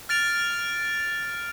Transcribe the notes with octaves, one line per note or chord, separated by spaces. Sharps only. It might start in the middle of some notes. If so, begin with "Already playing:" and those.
F6 A6 D7 F7